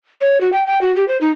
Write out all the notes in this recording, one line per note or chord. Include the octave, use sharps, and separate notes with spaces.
C#5
F#4
G5
G5
F#4
G4
C5
D#4